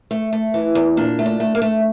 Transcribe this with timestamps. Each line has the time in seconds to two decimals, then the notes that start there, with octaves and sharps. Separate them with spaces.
0.11 A3
0.33 A3
0.54 E3
0.75 E2
0.97 A#2 D4
1.19 A3
1.26 D4
1.40 A3
1.55 A#3
1.62 A3